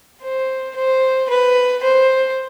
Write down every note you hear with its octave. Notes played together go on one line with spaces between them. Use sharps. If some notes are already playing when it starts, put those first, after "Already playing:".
C5
C5
B4
C5